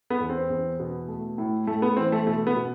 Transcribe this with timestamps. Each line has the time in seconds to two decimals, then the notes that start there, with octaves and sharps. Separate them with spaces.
0.10 B3
0.20 E2
0.30 C4
0.50 E2
0.79 B2
1.08 A3
1.38 A2
1.67 A2 A3
1.82 B3
1.97 E3 C4
2.12 A3
2.27 B2 A3
2.47 B3
2.55 B2